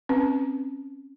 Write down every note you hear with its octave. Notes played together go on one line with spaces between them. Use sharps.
C4 C#4 B4